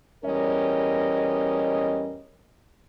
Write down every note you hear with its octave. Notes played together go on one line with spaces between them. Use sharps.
E2 G3 C#4 A#4 D#5